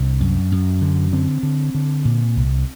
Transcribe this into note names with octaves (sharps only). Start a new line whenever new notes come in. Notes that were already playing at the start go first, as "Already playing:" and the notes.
Already playing: C2 D4
F#2
F#2
D3
D3 C4
D3
D3
A#2
C2